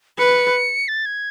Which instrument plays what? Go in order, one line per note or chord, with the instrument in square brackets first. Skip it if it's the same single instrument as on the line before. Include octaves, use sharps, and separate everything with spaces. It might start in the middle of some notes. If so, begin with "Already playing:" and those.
[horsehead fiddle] B4 [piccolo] C#7
[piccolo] A6
G#6